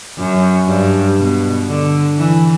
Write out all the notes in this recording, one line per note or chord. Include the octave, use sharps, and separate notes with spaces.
F#2
G2
B2
D3
E3